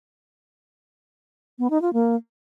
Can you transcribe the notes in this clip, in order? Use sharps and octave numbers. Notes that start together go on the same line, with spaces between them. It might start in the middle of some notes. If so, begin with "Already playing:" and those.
B3
D#4
F4
A#3